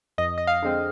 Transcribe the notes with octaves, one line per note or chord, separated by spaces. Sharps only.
F2 D#5
D#5
F5
D3 G#3 C4